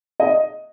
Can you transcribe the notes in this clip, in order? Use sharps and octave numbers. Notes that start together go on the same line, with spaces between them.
D#5